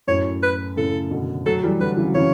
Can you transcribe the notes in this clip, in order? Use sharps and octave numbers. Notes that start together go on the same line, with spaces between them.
F#2 A2 C#5
B4
A2 C#3 A4
B2 D3
F#3 A3 A4
E3 G3
D3 F#3 B4
C#3 E3
F#3
C#3 E3 C#5